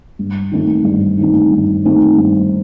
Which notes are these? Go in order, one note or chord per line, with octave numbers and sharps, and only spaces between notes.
G2
D#3 A3 C4 D#4
G2
D#3 A3 C4 D#4
G2
D#3 A3 C4 D#4
G2